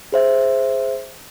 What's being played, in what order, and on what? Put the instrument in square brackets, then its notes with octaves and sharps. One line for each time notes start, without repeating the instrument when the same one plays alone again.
[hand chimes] G#4 C5 E5